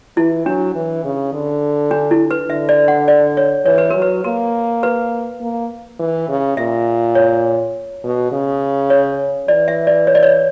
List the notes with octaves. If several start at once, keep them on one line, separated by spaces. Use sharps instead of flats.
E3 E4
F#3 D4
E3
C#3
D3
D4
E4
B4
D3 E5
D5
F#5
D5
C#5
E3 C#5
B4
F#3 A#4
B4
A#3 A#4
B4
A#3
E3
C#3
A#2 E5
C#5
B2
C#3
C#5
E3 D5
E5
D5
C#5
D5
C#5